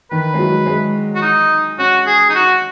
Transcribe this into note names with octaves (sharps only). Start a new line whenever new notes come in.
D#3 B4
G#3
F#3
G#3
F#4
D#4
C#4 F#4
G#4
D#4
F#4